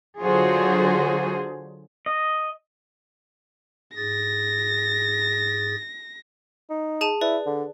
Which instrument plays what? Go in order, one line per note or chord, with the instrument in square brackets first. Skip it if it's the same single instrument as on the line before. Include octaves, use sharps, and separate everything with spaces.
[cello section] D3 F#3 F4 F#4 G#4 C5
[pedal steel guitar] D#5
[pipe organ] G#2 G#4 A6 [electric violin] A#6
[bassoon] D#4
[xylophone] G#4 A5 D#7
[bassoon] E4 [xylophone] B4 D5
[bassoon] D3